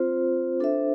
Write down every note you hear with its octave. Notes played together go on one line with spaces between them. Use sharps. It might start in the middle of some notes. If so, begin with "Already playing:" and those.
Already playing: C4 F4 C5
D4 A4 C5 E5